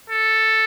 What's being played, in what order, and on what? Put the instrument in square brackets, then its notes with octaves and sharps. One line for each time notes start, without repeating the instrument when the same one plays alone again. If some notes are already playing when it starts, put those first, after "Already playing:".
[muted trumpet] A4